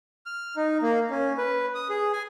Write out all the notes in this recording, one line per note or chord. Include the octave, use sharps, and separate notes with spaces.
F6
D#4
A#3
C#4
B4
D#6
G#4
G#5